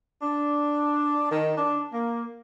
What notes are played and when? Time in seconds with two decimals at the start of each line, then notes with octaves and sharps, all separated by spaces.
0.22 D4
1.31 D#3
1.58 D4
1.92 A#3